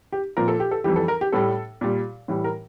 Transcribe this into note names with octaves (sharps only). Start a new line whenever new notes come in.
G4
A#2 F3 A#4
A4
G4
A4
F2 E3 G3 G4
A4
A#4
G4
A2 G3 A4
A#2 G3
A2 E3 G3
A#4